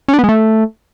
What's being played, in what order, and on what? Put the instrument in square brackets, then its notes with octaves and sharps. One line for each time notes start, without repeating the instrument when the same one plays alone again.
[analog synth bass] C#4
D4
B3
G#3
A3